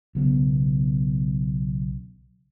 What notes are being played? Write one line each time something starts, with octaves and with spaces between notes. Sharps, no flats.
B1 C#3 B3